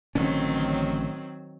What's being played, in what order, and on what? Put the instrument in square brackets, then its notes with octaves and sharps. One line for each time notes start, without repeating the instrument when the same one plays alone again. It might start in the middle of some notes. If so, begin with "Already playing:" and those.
[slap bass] A1 D3 C#4 [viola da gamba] D#3 F#3 C4